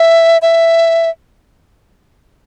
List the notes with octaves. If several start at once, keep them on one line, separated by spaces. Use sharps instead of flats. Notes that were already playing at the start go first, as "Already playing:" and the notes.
Already playing: E5
E5